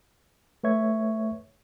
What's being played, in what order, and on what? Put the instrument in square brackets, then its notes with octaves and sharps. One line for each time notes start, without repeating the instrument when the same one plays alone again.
[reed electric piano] A3 B4 C#5 E5 C#6 G#6